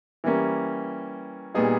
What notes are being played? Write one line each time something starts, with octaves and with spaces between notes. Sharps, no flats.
E3 G3 A#3 C#4
A#2 G3 B3 D#4 G#4